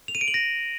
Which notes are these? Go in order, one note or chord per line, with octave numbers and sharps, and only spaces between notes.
F7
D#7
D7
F#7
A#6